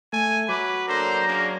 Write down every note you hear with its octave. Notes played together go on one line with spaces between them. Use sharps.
A3 G#5
F#3 B4 D6
A#3 D4 A4 C5 A#5
A#3 C#4 D4 G#4